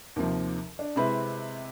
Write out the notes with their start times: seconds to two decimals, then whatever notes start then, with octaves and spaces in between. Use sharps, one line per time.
0.16 D#2 C3 F3
0.79 D4
0.96 C3 G#3 C4 E4 B4